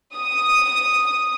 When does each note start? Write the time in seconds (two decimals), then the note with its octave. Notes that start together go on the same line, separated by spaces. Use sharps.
0.16 D#6